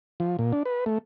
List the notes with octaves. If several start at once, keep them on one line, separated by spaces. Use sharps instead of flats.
F3
A#2
D4
B4
A3